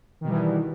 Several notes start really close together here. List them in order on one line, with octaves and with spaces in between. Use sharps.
D#3 B2 G3 E3